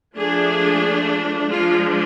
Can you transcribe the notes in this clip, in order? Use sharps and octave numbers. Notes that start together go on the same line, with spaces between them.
F3 A3 D4 G#4
F3 G#3 D4 F4